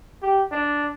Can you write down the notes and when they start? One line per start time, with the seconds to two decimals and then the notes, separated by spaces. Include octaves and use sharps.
0.22 G4
0.51 D4